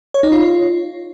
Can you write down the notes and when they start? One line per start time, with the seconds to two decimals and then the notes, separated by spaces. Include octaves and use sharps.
0.14 C#5
0.23 D#4
0.32 F4